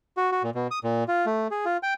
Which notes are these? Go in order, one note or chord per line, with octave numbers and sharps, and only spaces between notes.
F#4
F#4
A#2
B2
D#6
A#2
F4
A3
G#4
F4
G5